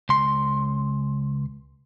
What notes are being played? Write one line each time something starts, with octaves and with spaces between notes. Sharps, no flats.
C#2 C6